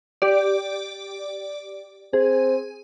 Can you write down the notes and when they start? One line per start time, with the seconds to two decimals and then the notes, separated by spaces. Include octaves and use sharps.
0.22 G4 D5
2.13 C4 G#4